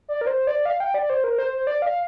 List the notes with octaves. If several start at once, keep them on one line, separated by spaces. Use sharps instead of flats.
D5
A#4
C5
D5
F5
G5
D5
C5
A#4
C5
C5
D5
F5